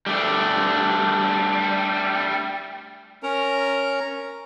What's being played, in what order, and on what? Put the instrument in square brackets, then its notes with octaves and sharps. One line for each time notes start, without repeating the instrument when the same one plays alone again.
[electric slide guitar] G3 A3 D4
[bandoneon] C#4 A#4 A#5